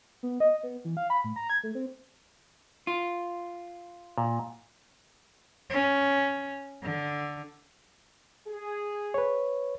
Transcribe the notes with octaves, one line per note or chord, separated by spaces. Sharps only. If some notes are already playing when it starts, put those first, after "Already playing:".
B3
D#5
B3
E3
F5
B5
A2
A#5
G#6
A3
C4
F4
A#2
C#4
D3
G#4
B4 C#5